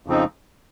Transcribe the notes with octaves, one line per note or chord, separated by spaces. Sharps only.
F2 C#3 F3 C4 D#4